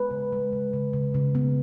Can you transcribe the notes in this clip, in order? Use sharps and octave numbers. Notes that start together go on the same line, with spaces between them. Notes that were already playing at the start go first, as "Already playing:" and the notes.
Already playing: G#3 B4
C#3
G#3
C#3
C#3
C#3
C#3
B3